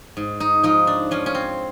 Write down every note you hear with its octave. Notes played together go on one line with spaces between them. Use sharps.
G#2
D#4
F3 D#4
D4
F3 C#4
C#4
C4